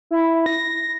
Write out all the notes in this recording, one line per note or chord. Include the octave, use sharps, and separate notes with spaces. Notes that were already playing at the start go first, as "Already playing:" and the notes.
E4
A#6